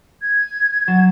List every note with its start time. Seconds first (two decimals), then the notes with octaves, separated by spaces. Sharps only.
0.22 G#6
0.87 F#3 A6 E7